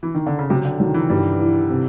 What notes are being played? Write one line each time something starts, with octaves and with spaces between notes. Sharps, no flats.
E3
D#3
D3
C#3
C3 F#3
D3
D#3 F#3
E3
G2 G3
E3
C3